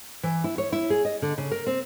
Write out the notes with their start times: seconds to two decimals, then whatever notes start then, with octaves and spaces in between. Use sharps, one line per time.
0.23 E3
0.44 E4
0.58 C#5
0.72 E4
0.90 G#4
1.05 D#5
1.22 D3
1.38 C#3
1.51 A#4
1.67 C4